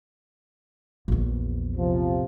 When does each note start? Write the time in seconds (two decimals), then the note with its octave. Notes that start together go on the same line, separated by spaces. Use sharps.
1.08 A#1 E2
1.77 C3 F3